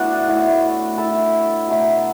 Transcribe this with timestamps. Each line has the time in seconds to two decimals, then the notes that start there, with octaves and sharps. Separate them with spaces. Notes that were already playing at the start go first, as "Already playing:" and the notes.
Already playing: A2 A3 B3 D4 F#4
0.28 A2 A3
0.98 E4 A4
1.68 B2 F#3 A3